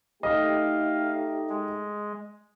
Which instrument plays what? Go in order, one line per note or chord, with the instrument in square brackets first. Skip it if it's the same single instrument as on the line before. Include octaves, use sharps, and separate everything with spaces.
[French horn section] A3 D#4 G4 [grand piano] D#5 [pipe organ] F5
[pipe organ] G#3